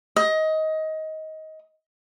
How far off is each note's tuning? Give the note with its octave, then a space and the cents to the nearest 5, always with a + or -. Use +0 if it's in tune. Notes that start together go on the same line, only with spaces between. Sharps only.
D#5 +20